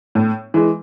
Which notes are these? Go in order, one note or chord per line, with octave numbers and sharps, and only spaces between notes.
A2
E3 G#3